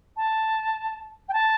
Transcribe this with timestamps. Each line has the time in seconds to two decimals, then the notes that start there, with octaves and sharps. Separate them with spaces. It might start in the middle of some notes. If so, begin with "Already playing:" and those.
0.17 A5
1.29 G5
1.33 A5